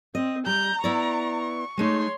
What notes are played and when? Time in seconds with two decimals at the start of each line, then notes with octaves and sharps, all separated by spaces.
0.15 C4 D#5
0.46 G3 A#5 G6
0.84 B3 E4 D5 C#6
1.78 G#3 A3 D#4 C#5 C6